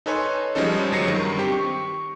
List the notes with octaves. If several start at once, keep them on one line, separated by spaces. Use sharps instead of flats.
D#4 A4 B4 C#5 G#5 C6
F3 G3 G#3 C#4 D#4 A4
G1 F#3 A#6 C7 C#7
G2 D#3
C4 G4
C#6